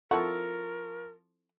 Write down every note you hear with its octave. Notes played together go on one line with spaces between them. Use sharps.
F3 C4 E4 A4 A#4 F#5 C#6